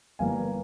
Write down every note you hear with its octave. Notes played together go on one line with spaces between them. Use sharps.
G1 G2 E3 G3 A#3 F5 G#5